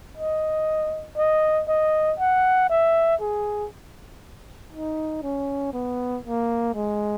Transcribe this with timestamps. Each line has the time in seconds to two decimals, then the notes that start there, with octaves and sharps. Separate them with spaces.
0.17 D#5
1.17 D#5
1.68 D#5
2.19 F#5
2.70 E5
3.21 G#4
4.73 D#4
5.23 C#4
5.73 B3
6.25 A#3
6.75 G#3